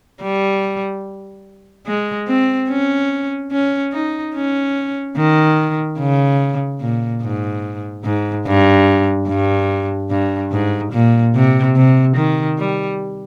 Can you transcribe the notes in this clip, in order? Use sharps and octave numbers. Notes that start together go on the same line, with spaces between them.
G3
G#3
C4
C#4
C#4
D#4
C#4
D#3
C#3
A#2
G#2
G#2
G2
G2
G2
G#2
A#2
C3
C3
D#3
G3